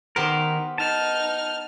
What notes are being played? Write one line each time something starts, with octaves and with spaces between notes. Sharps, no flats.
D#3 B3 G4 A#4 C5
D#4 A5 F6